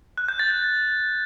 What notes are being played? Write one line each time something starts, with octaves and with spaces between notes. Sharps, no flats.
F#6
G6
A6
A6